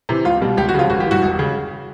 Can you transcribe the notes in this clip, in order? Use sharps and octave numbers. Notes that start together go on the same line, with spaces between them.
C3 E3
C#2 F4
B2 G3
C#2 G4
F#4
C#3 F3 F4
G#1 F#4
G4
G2 E3 F#4
E1
C#3